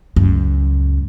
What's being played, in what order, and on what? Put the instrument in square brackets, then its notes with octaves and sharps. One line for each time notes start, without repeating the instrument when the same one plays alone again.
[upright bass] C#2 F#2